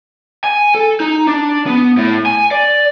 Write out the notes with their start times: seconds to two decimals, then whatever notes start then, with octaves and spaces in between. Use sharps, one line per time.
0.44 G#5
0.75 A4
1.00 D#4
1.27 D4
1.66 B3
1.97 A2
2.26 G#5
2.51 D5